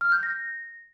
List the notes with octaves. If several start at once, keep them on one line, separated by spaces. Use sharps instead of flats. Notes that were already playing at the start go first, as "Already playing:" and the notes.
F6
G6
A#6